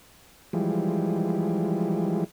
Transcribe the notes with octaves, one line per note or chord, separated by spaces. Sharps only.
E3 F3 G3 G#3